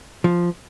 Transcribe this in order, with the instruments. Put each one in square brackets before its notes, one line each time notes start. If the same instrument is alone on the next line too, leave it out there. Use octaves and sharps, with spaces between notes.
[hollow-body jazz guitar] F3